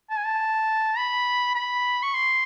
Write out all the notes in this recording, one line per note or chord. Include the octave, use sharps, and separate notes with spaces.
A5
G#5
A5
B5
B5
C#6
C6